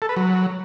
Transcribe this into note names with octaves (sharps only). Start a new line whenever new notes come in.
A4
B4
F#3